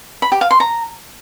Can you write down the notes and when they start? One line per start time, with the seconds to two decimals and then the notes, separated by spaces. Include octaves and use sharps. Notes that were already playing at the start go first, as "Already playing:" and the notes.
0.22 B5
0.32 G4
0.41 F5
0.51 C6
0.60 A#5